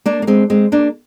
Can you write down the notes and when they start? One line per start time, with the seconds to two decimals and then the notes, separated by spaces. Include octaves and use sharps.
0.06 A#3 D4
0.22 A#3
0.27 G#3 C4
0.50 G#3 C4
0.72 A#3 D4